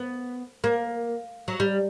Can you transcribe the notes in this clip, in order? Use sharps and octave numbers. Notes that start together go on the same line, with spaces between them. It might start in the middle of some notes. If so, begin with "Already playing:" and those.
Already playing: B3
A#3
F#3
G3